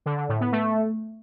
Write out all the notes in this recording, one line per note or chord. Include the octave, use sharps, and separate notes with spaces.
D3
D3
A2
B3
A3